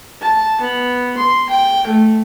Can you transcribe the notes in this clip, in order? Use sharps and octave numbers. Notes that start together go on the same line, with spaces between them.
A5
B3
C6
G5
A3